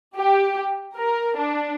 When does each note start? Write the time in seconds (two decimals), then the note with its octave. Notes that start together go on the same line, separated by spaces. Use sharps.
0.17 G4
0.96 A#4
1.37 D4